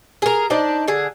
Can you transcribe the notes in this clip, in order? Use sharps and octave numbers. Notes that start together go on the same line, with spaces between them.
G#4 A#4
D4 D#4 C5 D5
D3 G#4